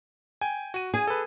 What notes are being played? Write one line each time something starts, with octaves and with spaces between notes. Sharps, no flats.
G5 G#5
F#4 D#7
G#4 G#5
A4 B4